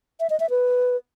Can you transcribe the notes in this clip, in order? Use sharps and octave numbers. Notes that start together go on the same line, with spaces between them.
E5
D#5
E5
B4